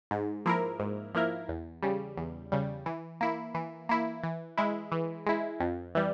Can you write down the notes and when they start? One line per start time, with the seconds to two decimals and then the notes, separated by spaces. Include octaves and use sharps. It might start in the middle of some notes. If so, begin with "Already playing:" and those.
0.11 G#2
0.46 F3 A#3 E4 A#4
0.80 G#2
1.15 F3 A#3 E4 A#4
1.49 E2
1.83 C#3 G3
2.17 E2
2.52 C#3 G3
2.86 E3
3.21 A#3 E4
3.54 E3
3.89 A#3 E4
4.23 E3
4.57 G#3 E4
4.92 E3
5.26 G#3 E4
5.60 F2
5.95 E3 G3